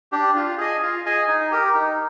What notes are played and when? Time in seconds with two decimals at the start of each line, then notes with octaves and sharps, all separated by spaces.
0.12 D4 G4
0.36 F4
0.58 G#4 D#5 G#5
0.82 F4
1.05 G#4 D#5 G#5
1.28 D#4
1.51 G4 A#4
1.74 D#4